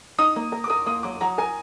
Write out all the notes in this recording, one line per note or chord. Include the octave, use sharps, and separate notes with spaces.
D#4 D#6
A#3
A#4
D6
A#4 D#6
A#3 D#6
F#3 D6
F#3 A#5
A#4 G#5